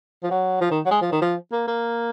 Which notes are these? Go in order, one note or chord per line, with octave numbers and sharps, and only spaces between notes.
F3
F#3
F3
D#3
F#3
G#3
F3
D#3
F3
A#3
A#3